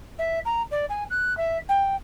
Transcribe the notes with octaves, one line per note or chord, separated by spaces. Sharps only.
E5
A#5
D5
G#5
F#6
E5
G5